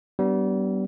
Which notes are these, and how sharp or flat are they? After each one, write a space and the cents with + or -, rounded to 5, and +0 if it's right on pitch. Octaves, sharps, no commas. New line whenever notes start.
G3 -30 B3 -5 D4 -20